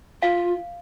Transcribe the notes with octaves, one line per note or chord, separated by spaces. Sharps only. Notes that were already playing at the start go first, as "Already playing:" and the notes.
F4 F5